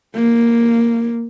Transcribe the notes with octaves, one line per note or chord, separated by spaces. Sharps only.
A#3